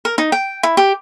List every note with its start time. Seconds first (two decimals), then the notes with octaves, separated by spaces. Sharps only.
0.05 A#4
0.18 D#4
0.32 G5
0.63 E4
0.77 G4